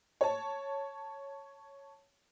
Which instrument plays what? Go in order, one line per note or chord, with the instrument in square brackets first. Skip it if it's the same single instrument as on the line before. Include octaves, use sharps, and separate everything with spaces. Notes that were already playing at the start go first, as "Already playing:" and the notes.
[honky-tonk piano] C#5 A5